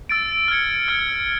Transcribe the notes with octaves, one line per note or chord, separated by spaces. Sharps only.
E6 A6 D7
F6 G#6 C#7
F6 G#6 C#7